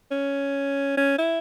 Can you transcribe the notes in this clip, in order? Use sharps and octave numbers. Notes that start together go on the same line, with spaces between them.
C#4
C#4
E4